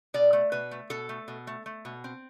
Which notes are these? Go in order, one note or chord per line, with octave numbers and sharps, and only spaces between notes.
B2 D5
A3
B2 B4
A3
B2 A4
A3
B2
A3
A3
B2
C4